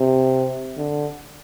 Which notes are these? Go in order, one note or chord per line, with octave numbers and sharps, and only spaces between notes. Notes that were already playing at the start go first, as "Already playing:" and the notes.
Already playing: C3
D3